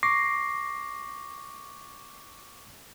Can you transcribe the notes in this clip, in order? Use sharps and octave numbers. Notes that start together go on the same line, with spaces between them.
C#6 D6 A#6 C7